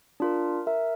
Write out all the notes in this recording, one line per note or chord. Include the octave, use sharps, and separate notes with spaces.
D4 F4 A#4
A#4 E5